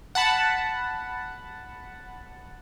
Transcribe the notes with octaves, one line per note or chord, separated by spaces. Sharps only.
F#5 A5 B5